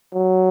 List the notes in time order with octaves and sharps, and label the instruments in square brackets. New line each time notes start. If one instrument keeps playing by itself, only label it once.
[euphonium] F#3